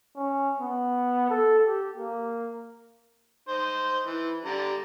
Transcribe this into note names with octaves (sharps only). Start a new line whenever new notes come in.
C#4
B3
A4
G4
A#3
D#4 C5
E3
D3 G3 A#5